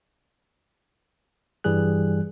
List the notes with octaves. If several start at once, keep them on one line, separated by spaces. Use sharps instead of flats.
G2 E3 G3 G#4 F#6